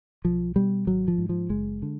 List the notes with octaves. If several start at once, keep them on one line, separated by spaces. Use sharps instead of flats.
B1 F3
B2 G3
G#1 F#3
F3
G#2
F3
F#1 G#3
D3